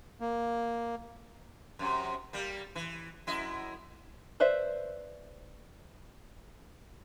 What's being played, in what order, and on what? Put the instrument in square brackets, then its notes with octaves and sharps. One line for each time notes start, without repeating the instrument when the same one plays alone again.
[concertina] A#3
[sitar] F#2 C3
G3 A#3
E3
F#2 E4 D#5
[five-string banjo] B4 C5 D5 E5